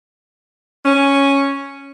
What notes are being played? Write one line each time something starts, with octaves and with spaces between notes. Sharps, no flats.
C#4